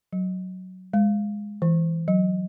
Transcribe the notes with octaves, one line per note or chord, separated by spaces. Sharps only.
F#3
G#3
E3
F#3